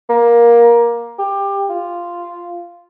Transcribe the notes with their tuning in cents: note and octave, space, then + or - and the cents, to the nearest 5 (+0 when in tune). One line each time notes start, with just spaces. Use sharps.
A#3 +15
G4 +20
F4 -5